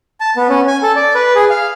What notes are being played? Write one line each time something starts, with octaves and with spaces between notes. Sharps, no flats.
A5
B3
C#4
G#5
A4
D5
B4
G#4
F5